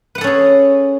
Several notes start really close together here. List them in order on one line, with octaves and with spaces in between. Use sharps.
B4 F#5 A4 C#4 G#4